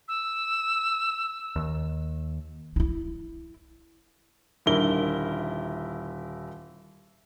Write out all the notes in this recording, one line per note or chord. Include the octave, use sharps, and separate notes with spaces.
E6
D#2
D#4 E4
D#1 D3 E4 A#4 G7